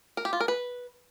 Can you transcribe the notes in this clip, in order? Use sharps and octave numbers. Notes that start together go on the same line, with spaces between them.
A#4
G4
F4
A#4
B4